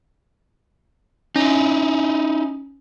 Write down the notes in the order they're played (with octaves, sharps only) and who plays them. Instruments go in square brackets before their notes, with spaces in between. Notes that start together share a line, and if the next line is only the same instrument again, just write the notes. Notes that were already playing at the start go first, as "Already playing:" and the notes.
[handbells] C#4 [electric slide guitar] D#4 E4